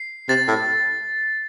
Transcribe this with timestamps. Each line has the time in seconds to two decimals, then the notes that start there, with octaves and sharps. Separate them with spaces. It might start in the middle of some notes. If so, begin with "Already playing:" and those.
Already playing: C7
0.29 C3 A6
0.48 A2